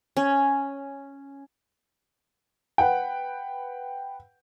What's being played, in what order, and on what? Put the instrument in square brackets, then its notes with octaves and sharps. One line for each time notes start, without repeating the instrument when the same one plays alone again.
[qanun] C#4
[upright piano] B4 F#5 G5